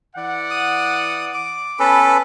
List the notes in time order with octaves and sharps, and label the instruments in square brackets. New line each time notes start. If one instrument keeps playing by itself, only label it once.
[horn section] E3 D5 F#5
[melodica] D#6
D6
[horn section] B3 A5 B5 [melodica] C#4 A4 B4